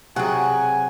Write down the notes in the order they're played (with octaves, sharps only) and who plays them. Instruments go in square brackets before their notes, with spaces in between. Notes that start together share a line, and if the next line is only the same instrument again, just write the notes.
[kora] C3 F#3 G#4 [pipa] C4 F#4 [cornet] G#5